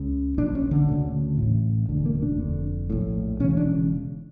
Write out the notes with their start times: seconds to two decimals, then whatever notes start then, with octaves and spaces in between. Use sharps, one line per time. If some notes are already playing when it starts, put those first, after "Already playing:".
Already playing: C#2 C#3
0.38 A#1 A#2 D4
0.55 C#4
0.71 D3
0.89 D2 C#3
1.38 A1 A2
1.89 E1 D2 D3
2.06 A#3
2.22 D4
2.39 F1 F2 D3
2.90 A#1 A2
3.40 E1 E2 C#3 C#4
3.57 D4